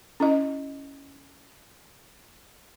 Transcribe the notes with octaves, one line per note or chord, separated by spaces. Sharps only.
C#4 E4 D#5